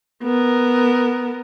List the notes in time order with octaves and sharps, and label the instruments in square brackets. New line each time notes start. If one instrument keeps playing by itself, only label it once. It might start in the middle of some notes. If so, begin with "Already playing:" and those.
[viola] B3 A#4